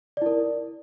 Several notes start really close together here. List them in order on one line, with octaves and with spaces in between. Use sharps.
D5 E4 A#4